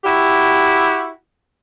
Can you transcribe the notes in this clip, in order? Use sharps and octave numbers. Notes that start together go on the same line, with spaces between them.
E4 F#4 G4